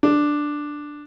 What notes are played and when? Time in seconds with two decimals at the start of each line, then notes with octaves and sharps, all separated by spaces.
0.03 D4